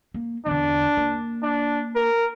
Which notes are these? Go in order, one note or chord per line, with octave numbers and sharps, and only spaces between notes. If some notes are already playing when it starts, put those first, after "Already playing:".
A#3
E2 D3 D4
A#3
D4
A#4